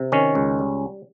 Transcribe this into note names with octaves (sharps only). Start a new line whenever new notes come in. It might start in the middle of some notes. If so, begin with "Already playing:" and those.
Already playing: C3
D#3 C#4
C#2
G3